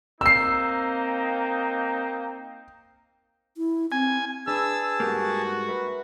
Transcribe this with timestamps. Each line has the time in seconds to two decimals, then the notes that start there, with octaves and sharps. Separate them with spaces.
0.21 A#3 C4 D#4 E6 C7
3.57 E4
3.92 C4 G#5
4.47 D4 G#4 B4 A5 E6
5.00 G#2 G3 A#3 F#4
5.68 A#4 B4 E5